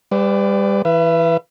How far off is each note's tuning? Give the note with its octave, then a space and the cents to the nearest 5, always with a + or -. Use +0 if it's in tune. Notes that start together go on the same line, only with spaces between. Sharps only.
G3 +25 B4 +40 D5 +0
E3 +0 B4 +0 E5 +40